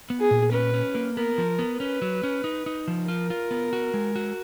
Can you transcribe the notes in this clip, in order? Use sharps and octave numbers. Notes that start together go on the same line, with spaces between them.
B3
G#4
A#2
C#4 B4
C#4
A#3
B3 A#4
F3
B3
C#4 B4
F#3
C#4
D#4
D#4
F3
F4 A#4
F4
B3
F#4
G#3
F#4